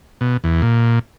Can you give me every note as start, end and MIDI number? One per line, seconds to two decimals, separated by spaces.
0.21 0.37 47
0.44 0.62 40
0.62 0.99 46